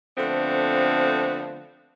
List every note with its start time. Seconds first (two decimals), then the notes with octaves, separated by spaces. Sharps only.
0.18 D3 F3 A3 B3 C4